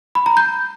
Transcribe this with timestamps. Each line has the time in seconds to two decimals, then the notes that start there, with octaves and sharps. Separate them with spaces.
0.15 B5
0.26 A#5
0.37 G6